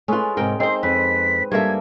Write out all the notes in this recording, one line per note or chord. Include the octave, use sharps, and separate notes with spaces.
G#3 A3 C#4 F4 B4
G#2 C3 A#4 G5
C4 D#4 C5 D5 C7
F2 B4 B6
G2 G3 A#3 A4 E5 G#6